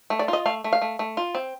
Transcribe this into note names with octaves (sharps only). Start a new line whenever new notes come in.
A3
D5
F4
D#5
A3 F5
A3
F5
A3
A3
F4
C4